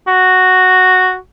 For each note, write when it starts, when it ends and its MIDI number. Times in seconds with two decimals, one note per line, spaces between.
0.08 1.17 66